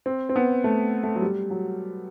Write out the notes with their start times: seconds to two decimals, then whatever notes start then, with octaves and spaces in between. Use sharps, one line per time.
0.06 C4
0.29 C4
0.36 B3
0.64 A3
1.03 A3
1.15 F#3
1.22 G3
1.50 F#3